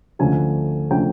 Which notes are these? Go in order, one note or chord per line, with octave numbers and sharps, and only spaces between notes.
D2 D3 F3 A3 C#4 G#5
D3 F3 A3 C#4 G5